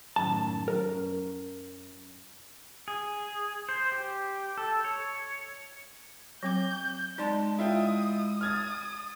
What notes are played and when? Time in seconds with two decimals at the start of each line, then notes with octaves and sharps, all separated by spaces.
0.16 F#2 A2 D#3 A5
0.68 F#2 A#4
2.88 G#4
3.69 C5
3.92 G4
4.57 A4
4.84 C#5
6.43 F#3 C4 D6 G6
7.18 G#3 D#4 D5 A5 C6
7.59 E4 F4 G5 D#6
8.41 D#6 F6 G#6 A6